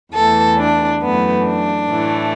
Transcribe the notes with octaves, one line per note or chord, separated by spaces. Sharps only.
E2 E3 A3 A4
D4
F#2 E3 A3 B3
D4
A2 E3 A3